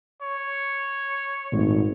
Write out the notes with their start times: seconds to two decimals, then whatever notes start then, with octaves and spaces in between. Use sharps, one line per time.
0.22 C#5
1.52 G#1 A#2 G#3 A3